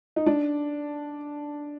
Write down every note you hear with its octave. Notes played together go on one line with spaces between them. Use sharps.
D#4
D4